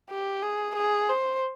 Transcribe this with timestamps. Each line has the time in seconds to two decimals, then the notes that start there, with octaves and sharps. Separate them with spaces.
0.10 G4
0.43 G#4
0.76 G#4
1.09 C5